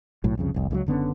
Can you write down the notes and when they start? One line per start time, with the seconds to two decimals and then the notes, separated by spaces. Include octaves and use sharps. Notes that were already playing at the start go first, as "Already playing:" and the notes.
0.24 B1 A2 F#3
0.37 C2 F2 C#3
0.54 F1 C2
0.71 C#2 D3 F#3
0.86 F#1 D3 B3 C#4